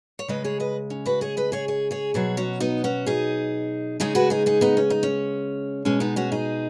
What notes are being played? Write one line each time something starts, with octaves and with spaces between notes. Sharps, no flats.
C#5
C#3 G#3 B4 D#5
G#4 C#5
B4 D#5
C#4
F#4 B4
G#4 C#5
B4 D#5
G#4 C#5
G#4 C#5
G#4 C#5
B2 F#3 G#4 C#5
C#4 F#4
B3 D#4
C#4 F#4
D#4 G#4
C#3 G#3 D#4 G#4
F#4 B4
D#4 G#4
D#4 G#4
B3 D#4
C#4
D#4
C#4
B2 G#3 C#4
B3 D#4
C#4 F#4
D#4 G#4